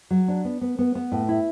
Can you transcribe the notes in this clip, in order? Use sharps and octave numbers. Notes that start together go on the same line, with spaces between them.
F#3
D4
B3
B3
B3
B3
A2
E4